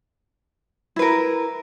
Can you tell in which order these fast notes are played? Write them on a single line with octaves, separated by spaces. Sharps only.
E4 B4 A#4